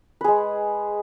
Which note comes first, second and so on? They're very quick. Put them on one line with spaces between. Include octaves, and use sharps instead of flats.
B4 G#4 G#3